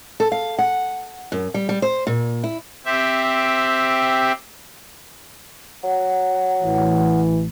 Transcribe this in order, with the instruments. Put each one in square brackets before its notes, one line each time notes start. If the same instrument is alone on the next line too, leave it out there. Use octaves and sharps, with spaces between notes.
[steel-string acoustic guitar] A4
F5
F#5
F#2
G3
G3
C5
A#2
E4
[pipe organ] C4 G4 E5
[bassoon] F#3 [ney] F#5
[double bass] A1 [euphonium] E3